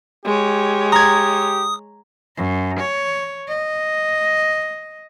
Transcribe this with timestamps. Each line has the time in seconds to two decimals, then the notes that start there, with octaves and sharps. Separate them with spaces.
0.25 G#3 G4 C#5
0.92 A#5 D#6 G#6
2.37 F#2
2.79 C#5
3.48 D#5